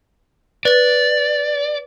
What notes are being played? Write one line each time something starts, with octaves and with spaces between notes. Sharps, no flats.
B4 D5 A6